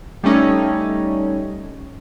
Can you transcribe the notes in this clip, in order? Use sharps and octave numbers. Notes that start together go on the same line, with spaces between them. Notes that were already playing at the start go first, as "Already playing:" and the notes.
G3 A3 C#4 D#4